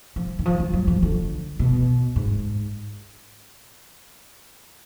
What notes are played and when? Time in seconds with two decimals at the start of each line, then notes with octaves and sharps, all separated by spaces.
0.16 F3
0.39 D#3
0.46 F3
0.60 F3
0.74 F#3
0.87 F3
1.02 D3
1.59 B2
2.16 G#2